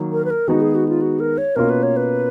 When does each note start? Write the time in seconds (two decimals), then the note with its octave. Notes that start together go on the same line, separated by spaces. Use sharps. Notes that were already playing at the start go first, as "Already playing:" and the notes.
Already playing: D#3 F#3 A#3
0.12 A#4
0.25 B4
0.30 A#4
0.48 D#3 G#3 B3 D#4 F#4
0.61 G#4
0.75 F#4
0.89 F4
1.02 F#4
1.20 A#4
1.38 C#5
1.56 B2 A#3 C#4 F4 A#4
1.70 B4
1.83 C#5
1.97 B4